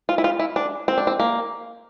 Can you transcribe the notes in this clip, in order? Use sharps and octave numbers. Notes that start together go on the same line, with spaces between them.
F4
E4
F4
E4
D4
C4
D4
C4
A#3